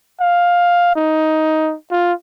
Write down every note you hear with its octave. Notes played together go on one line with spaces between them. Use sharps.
F5
D#4
F4